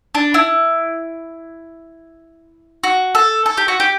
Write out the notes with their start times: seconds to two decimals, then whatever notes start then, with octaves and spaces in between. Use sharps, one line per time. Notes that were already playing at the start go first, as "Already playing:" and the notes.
0.15 D4
0.34 E4
2.83 F#4
3.15 A4
3.46 A4
3.57 G4
3.68 F#4
3.80 G4